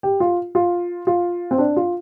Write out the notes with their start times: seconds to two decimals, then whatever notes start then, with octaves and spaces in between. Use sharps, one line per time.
0.03 G4
0.20 F4
0.55 F4
1.07 F4
1.51 C4
1.58 D4
1.76 F4